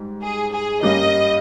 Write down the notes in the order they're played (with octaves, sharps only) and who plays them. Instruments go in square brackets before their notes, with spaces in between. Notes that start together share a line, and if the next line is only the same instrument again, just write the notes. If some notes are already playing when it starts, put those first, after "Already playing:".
Already playing: [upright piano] G#2 G3
[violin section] G#4
G#4
[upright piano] G2 G3 A#3 C#4 [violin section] D#5